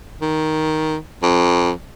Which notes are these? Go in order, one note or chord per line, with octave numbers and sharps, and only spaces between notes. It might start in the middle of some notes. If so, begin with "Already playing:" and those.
D#3
F2